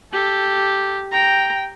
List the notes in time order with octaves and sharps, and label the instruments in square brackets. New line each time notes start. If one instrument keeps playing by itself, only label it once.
[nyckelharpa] G4 [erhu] A4
[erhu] G5 [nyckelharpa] A#5